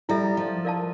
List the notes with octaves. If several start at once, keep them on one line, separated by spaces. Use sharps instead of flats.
G3 E4 A4 E5
F3
A#4 D5 F5 A5